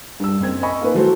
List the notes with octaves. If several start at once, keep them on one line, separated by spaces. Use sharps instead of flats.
G2 E6
F#1 C4 G#6
D#5 G#5 B5 C#6
A#3 D#4 B4
E3 F#3 A3 F#4 C5